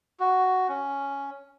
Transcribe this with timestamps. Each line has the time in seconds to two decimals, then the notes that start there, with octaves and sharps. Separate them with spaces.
0.20 F#4
0.69 C#4